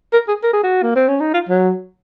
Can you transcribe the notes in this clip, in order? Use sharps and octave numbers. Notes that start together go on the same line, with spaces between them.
A#4
G#4
A#4
G#4
F#4
A#3
C4
C#4
D#4
F4
F#3